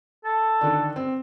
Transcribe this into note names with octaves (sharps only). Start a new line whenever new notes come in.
A4
D3 D#3 D4
C4